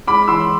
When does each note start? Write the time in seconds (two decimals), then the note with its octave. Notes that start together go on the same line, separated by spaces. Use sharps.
0.07 G#3 B5 D6
0.28 E3 C6 E6